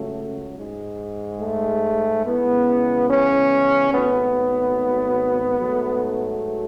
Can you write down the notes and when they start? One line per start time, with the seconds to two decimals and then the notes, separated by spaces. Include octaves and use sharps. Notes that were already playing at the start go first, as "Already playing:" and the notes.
Already playing: C#2 C#3 F#3 A3
0.57 G#2 G#3
1.41 A3
2.24 E2 C#3 E3 G#3 B3
3.09 C#4
3.92 G#1 G#2 F#3 A3 B3
5.59 G#2 F#3 A3